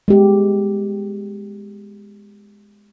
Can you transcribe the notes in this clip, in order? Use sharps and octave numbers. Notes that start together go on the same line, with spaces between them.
G#3 B3 G4